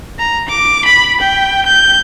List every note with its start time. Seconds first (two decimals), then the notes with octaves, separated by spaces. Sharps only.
0.19 A#5
0.49 D6
0.85 B5
1.21 G5
1.67 G6